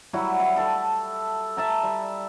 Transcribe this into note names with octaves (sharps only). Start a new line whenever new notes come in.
F#3 G3 E4 F#4
E4
A4 A5
E5 A5 A#5
G3